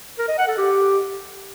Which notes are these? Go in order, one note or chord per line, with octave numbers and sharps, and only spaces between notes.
A#4
D#5
F#5
A4
G4